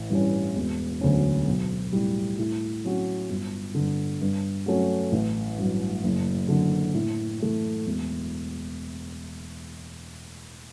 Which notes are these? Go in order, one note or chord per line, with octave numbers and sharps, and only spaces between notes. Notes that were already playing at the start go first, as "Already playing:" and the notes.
Already playing: A1
G2 E3 G3 C#4
E1
D2 D3 F#3 C#4
B1
A2 G3
A2
F#3 C#4 F#4
G1
G2 D3
G2
F#3 A3 C#4 F#4
A1
G2 F#3
F#1
F#2 D3
A2
E3 A3 E4
E1